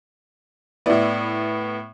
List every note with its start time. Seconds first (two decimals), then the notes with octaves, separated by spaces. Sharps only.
0.86 A2 B3 E4 D5